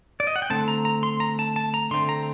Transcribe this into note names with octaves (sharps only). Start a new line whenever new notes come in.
D5
D#5
F#5
G5
D3 A3 C4 A5
A#5
A#5
C6
A#5
A5
A5
A#5
D3 A3 C4 C6
A#5